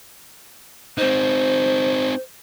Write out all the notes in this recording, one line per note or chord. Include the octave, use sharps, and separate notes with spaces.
C4 D#4 C5